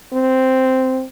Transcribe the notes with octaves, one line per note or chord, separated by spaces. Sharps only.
C4